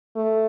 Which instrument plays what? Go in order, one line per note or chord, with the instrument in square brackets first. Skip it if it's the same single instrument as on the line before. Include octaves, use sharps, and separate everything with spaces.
[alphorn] A3